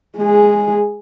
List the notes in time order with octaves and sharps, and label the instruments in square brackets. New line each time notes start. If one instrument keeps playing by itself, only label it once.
[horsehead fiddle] G#3 G#4